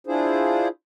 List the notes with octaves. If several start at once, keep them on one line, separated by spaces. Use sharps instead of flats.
D4 E4 F4 G#4 C5